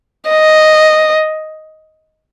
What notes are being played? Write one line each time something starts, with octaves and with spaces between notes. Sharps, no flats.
D#5